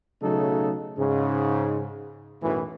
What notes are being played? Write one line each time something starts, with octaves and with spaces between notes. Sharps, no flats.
B1 C#3 F#3 A3 D#4 A4
G#2 C#3
B1 F#2 A2 E3